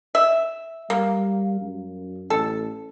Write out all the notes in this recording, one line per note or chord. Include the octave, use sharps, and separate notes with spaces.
E5
G3 A#3
F#2
A1 A4